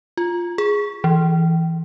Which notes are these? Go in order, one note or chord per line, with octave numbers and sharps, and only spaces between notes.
F4
G#4
E3